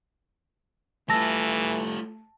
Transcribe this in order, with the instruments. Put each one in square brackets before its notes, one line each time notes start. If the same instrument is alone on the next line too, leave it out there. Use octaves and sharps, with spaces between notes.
[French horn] E3 [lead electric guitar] G3 F4 [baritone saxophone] A3 [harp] A5 E6 A#6